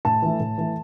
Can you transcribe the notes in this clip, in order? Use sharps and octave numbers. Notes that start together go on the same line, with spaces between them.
A2 A5
E3 A3
A2
E3 A3